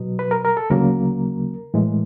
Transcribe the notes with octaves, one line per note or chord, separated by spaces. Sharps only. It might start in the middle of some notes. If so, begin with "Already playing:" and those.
Already playing: B2 F#3 B3
B4
A#4
A#4
A4
D2 C#3 F#3 A#3 A#4
A2 E3 G#3